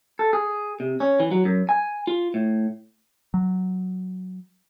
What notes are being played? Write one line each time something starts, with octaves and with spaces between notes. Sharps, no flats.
A4
G#4
C3
C#4
E3
F#3
F#2
G#5
F4
A2
F#3